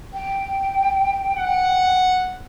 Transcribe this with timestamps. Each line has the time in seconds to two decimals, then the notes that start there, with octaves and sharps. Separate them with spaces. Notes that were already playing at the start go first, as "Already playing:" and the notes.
0.14 G5
1.37 F#5